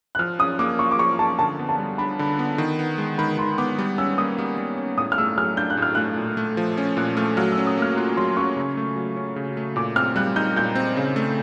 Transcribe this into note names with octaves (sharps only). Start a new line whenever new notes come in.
F#6
F3 F6
C#4 D#6
A#3 D6
F4 C#6
D6
F3 C#6
C#4 A5
D3 A5
B3
A5
G3
D4 B5
D3
B3
D#3
B3
G#3
D#3 B5
D#3 C6
B3 D6
G3
C#4 E6
A#3 D#6
G3
G3
C#4
A2 D#6
F6
A3 E6
F#3 F6
D4 G6
F#6
A2
F6
A3 F#6
A#2
A3
F3
C#4
A#2 F#6
A3 F6
F#3 F6
E6
C#4
D#6
A#3 F6
F4 F#6
F#3 C6
C#4 C#6
C#3
A3
F#3
C#4
C#3
A3
A#2 D6
C4 F6
G3 F#6
D#4 G6
A#2 G6
C4
C#3
A3